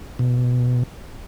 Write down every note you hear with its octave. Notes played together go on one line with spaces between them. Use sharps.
B2